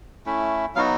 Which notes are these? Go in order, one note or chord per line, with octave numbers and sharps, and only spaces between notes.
A3 C#4 E4
F#3 B3 D#4 F#4 F5